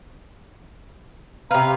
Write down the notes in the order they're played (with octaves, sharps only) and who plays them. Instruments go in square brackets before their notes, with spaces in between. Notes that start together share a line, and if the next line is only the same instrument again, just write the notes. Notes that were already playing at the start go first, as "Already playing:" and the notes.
[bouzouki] C3 B4 [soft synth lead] F5 [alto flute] A#5